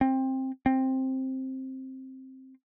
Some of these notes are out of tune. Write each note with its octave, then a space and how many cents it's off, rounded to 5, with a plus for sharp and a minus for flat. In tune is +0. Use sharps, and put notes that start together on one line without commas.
C4 +15
C4 +10